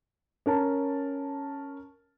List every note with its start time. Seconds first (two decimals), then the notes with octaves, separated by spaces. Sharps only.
0.46 C#4 A#4 A5